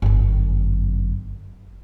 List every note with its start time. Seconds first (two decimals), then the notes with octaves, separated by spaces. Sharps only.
0.02 G1 F#2